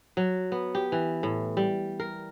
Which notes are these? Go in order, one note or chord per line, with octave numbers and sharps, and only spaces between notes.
F#3
B3
G4
E3
A2
G3
A#4